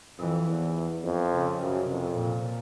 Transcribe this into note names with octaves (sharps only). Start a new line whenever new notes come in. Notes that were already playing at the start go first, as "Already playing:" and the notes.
F2 E3
E2
F2
C#3
F#2
F2 C3
A#2